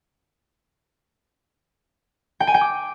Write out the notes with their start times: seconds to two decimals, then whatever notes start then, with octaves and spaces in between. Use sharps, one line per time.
2.40 G5
2.47 G#5
2.54 G5
2.61 D6